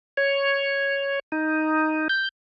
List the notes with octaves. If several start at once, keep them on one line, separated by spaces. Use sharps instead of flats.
C#5
D#4
G6